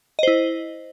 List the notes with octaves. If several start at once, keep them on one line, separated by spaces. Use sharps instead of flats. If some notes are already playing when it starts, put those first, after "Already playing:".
E4 C5 D#5